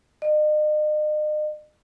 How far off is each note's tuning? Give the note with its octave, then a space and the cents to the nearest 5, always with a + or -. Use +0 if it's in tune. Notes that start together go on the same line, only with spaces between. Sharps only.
D#5 -40